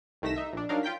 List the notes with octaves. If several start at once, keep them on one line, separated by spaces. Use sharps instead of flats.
C2 D#3 A3 A#6 B6 E7
D#4 E5
A#1 D4
F#3 D4 D#4 A#4 F5
F4 G5 G6 B6